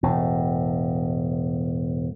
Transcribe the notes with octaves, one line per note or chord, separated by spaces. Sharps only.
E1 A2